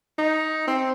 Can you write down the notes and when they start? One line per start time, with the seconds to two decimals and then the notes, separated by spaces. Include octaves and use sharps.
0.19 D#4
0.67 C4